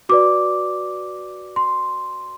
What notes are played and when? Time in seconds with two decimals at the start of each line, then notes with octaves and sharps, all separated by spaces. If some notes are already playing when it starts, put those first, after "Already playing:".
0.09 F#4 B4 D5 D6
1.56 C6